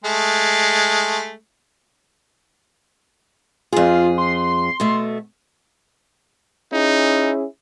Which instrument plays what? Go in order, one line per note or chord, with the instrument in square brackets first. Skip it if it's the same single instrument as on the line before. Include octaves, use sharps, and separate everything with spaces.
[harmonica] G#3 A3
[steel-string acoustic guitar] F2 G#4 [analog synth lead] F4
[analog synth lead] C6
[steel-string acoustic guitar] B2 A3
[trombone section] C#4 E4 G#4 [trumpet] D#4